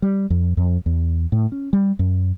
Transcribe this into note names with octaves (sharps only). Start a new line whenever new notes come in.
G3
F2
F2
E2
A2
C#4
G3
F#2